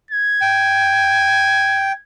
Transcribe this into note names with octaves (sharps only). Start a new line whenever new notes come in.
G#6
G5